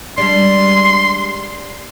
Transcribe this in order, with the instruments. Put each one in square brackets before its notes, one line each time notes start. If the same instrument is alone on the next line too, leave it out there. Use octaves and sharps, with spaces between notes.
[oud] G3 G#3 D4 [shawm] C6